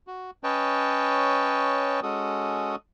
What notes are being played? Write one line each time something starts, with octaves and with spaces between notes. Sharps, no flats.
F#4
C#4 B4 C#5 D#5 G5 A5
G#3 C#4 F#4 A4 D#6